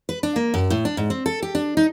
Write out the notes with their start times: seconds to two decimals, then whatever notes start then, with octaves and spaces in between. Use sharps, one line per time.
0.09 B4
0.23 D4
0.36 A#3
0.54 F#2
0.70 A2
0.85 D4
0.97 G#2
1.10 C4
1.26 A4
1.42 G4
1.55 D4
1.77 D#4